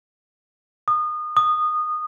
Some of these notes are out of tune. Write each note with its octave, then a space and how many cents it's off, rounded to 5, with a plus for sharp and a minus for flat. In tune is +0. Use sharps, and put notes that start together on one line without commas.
D#6 -30
D#6 -20